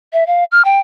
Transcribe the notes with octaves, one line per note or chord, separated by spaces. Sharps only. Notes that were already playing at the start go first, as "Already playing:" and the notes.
E5
F5
F6
G5